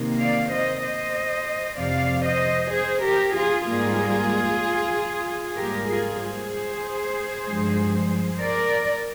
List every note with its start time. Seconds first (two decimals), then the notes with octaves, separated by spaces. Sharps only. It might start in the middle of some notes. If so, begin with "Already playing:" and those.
Already playing: C3 D#3 A#3
0.20 D5 F5
0.51 C5 D#5
0.83 C5 D#5
1.77 F2 C3 F3 D5 F5
2.25 C5 D#5
2.72 G#4 C5
3.04 G4 A#4
3.35 F4 G#4
3.67 G#2 G3 A#3 F4 G#4
5.56 G#2 G3 A#3 G4 A#4
5.88 F4 G#4
6.20 G#4 C5
7.47 G2 F3 G#3
8.41 A#4 D5